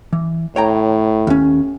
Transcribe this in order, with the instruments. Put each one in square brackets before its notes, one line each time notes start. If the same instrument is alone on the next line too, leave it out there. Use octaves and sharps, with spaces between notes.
[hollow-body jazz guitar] E3
[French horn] A2 [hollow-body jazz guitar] C#5 G5 A#5
[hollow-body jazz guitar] D#2 C#4